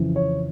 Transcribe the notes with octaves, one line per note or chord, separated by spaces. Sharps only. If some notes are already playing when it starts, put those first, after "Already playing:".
Already playing: F2 C#3 E3
C#5